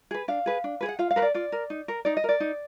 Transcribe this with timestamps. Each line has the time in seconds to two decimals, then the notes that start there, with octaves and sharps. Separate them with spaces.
0.11 G#4 B4
0.28 D4 F5
0.46 G#4 B4
0.64 D4
0.81 G#4 B4
0.89 F#5
0.99 F4 F5
1.11 F5
1.16 A#4 B4
1.22 D5
1.34 F4 D5
1.52 A#4
1.70 D#4
1.88 A#4
2.05 D#4 D5
2.17 D#5
2.24 A#4 D5
2.40 D#4